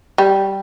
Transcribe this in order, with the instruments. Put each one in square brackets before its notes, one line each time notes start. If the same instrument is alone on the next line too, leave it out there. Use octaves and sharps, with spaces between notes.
[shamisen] G3